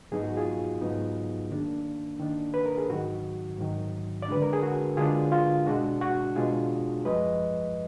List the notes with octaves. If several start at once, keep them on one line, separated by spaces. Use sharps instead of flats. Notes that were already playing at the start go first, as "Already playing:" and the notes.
G#2 F#3 B3 D#4 G#4
F#4
F4 G#4
G#2 F#3 B3 D#4
D#3 A#3 D4
D#3 A#3 D4
B4
A#4
G#4
G#2 D#3 F#3 F#4
G#2 D#3 F#3
D5
D3 G#3 D4 B4
A#4
G#4
F#4
D3 G#3 D4 F4 G#4
F4
B2 G#3 D4 F#4
F#4
B2 G#3 D4 F4 G#4
F#2 F3 G#3 B4 D#5